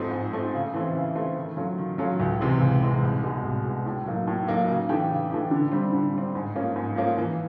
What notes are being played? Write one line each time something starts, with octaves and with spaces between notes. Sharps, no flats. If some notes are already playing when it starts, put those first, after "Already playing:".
Already playing: G#2 F3 A3 C4 D#4
G#2
F3 A3 C4 D#4
C#3
E3 A3 C4 E4
C#3
E3 A3 C4 E4
D#3
F#3 A3 C#4 F4
D#3
F#3 A3 C#4 F4
C#2
C3 E3 G#3
C#2
C3 E3 G#3
C2
B2 G#3
C2
B2 G#3
A2
F#3 A#3 D#4
A2
F#3 A#3 D#4
C#3
E3 A3 D4 G4
C#3
E3 A3 D4 G4
D3
G3 C4
D3
G3 C4
G#2
F3 A#3 C#4
G#2
F3 A#3 C#4
E3